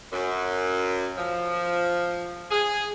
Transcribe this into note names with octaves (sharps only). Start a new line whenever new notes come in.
F#2
F3
G#4